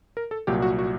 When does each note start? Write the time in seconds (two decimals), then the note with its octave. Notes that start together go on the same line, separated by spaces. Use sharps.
0.17 A#4
0.31 A4
0.47 C2 A#2 F#3 G4
0.62 F#4
0.79 F#4